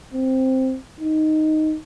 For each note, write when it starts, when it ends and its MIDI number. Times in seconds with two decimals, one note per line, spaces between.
0.14 0.77 60
1.00 1.76 63